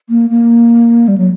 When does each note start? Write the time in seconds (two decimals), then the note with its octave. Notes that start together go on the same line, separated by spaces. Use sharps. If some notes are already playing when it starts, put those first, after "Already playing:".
0.10 A#3
0.30 A#3
1.08 G3
1.18 F#3